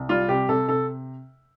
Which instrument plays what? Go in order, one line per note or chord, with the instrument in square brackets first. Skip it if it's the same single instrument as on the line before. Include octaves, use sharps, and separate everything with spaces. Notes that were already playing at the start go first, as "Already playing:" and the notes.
Already playing: [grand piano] C2
G3 F4
C3 G4
C3 A4
C3 A4